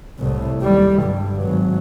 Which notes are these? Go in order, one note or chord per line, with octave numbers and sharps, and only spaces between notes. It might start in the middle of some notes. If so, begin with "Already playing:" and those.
C2 A2
D#2 G3
G2 D3
G#1 F#3